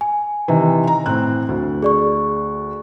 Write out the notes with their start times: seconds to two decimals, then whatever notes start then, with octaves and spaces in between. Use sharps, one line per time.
0.01 G#5
0.48 C3 D#3 E3
0.87 A#5
1.06 A2 C4 F#6
1.49 D2
1.83 G#4 D5 C#6